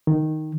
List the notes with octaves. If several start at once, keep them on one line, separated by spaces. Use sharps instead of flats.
D#3